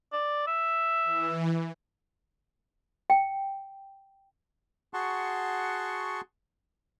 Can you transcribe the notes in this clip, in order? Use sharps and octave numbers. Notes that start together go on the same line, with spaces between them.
D5
E5
E3
G5
F#4 G#4 F#5 A5 C6 C#6